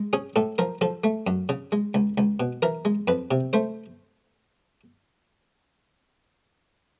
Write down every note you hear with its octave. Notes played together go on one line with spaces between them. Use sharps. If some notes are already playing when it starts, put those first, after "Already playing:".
Already playing: G#3
C#4 G#4
A2 A4
F3 A#4
F3 A4
A3
F#2
C#3
G#3
C#2
C#2
B2
E3 A#4
G#3
F2 B4
C3
A3 C5